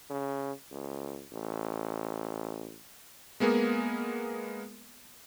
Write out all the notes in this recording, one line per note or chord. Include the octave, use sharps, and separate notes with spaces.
C#3
C#2
A1
G#3 A#3 B3 G#4 A#4